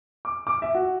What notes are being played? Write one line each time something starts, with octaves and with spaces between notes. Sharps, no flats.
D6
D6
E5
F#4